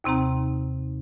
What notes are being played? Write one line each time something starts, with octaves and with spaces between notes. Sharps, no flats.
D#2 C3 C4 D#4 A#5